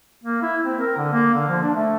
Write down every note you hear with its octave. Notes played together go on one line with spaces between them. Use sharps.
A#3
E4
C4
A#4
D3
A#3
D3
F3
D4
A3